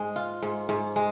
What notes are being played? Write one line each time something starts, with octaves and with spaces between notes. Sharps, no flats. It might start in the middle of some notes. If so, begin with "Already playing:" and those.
Already playing: G#2 G#3
F4
G#2
G#2
G#3